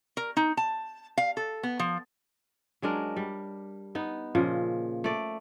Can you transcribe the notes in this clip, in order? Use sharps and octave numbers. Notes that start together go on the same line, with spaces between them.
A#4
D#4
A5
F5
A4
B3
F3
F#3 G#3 D4 A#4
G3
B3 D#4
A#2 C#3 F3
A3 D5